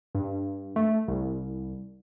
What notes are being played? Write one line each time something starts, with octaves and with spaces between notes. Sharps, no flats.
G2
A3
C2